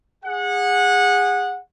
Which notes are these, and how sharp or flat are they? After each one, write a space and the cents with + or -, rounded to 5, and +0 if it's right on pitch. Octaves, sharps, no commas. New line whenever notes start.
G#4 -25 F#5 -20